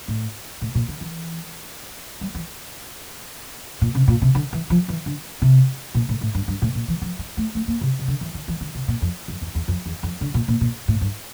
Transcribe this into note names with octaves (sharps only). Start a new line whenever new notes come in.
A2
A2
A#2
D3
E3
G3
E3
A#2
C3
A#2
C3
D3
E3
F3
E3
D3
C3
A#2
A2
A2
G2
G2
A2
A#2
E3
F3
G3
A3
A3
A#3
C3
C3
D3
E3
D3
E3
D3
C3
A#2
F2
F2
E2
E2
F2
E2
F2
D3
A#2
A#2
A#2
A2
G2